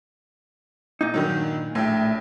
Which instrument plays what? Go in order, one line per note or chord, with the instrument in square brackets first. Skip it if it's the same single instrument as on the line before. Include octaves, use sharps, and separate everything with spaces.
[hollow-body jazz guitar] A#2 D#4
[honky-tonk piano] G2 D#3 F#3
[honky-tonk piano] A#1 G5 [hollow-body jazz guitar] A2